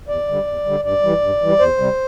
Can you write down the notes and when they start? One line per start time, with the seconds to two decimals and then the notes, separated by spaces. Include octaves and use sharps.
0.08 E2 D5
0.28 D3 G3
0.47 E2
0.65 D3 G3
0.83 G2 D5
1.02 E3 G3
1.21 G2
1.41 E3 G3
1.59 E2 C5
1.78 C3 G3